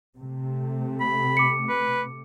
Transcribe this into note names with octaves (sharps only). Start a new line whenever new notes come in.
C3 A3
B5
D6 C#7
B4